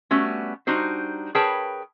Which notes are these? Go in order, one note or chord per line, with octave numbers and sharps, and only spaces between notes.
G3 A3 B3 C#4 F#4
G3 D4 D#4 F#4 C5
G#4 A#4 B4 C#5 G5 A5